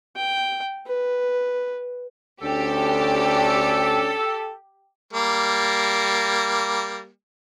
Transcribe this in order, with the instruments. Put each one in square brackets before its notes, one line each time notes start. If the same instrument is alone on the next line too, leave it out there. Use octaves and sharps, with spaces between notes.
[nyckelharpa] G5
B4
[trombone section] D2 C#4 D4 [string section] G4 [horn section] A4
[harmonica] G3 A#3